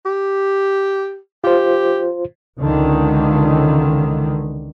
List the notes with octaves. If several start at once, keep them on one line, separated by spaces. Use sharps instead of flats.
G4
F4 G4 C5
C#2 D3 D#3